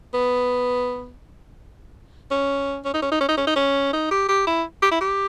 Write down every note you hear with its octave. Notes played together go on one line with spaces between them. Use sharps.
B3
C#4
C#4
D#4
C#4
D#4
C#4
D#4
C#4
D#4
C#4
D#4
G4
G4
E4
G4
E4
G4